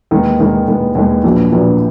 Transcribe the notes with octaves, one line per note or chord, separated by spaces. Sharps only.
D#2 D#3 G#3 B3
D#2 D#3 G#3 B3
D#2 D#3 G#3 B3
D#2 D#3 G#3 B3
A#1 A#2 F#3 B3
A#1 A#2 F#3 B3